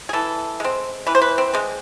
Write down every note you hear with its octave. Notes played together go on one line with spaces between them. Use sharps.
G#4
E3 A4
G#3 C4
E3 B4
C5
B4
C4
G#3 C4